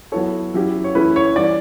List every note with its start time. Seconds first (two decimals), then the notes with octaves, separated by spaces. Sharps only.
0.12 F#3 B3 E4 A4 C#5
0.54 F#3 C#4 E4 G4
0.84 C#5
0.95 E3 A3 C#4 E4 B4
1.16 C#5
1.36 E3 G3 D4 D5